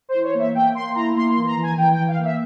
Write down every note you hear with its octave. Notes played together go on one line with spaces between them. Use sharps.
C5
E3
C#5
A#3 E5
A#3 G5
A#3 C6
E4 A#5
A#3 C6
C6
E3
A#5
E3
G#5
E3 G5
G5
E3
F5
A#3
E5